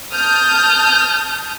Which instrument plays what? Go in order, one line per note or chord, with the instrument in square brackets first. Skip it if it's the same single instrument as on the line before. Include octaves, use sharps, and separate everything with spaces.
[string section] A5 D#6 F6 G6